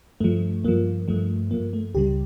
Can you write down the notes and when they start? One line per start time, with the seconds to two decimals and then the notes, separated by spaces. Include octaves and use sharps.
0.20 G2 F3 A3
0.64 G2 F3 A#3
1.08 G2 F3 A3
1.51 G2 F3 A#3
1.73 A3
1.94 C#2 C#3 G3 G4